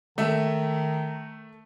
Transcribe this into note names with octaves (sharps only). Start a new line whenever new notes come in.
D#3 A3 E5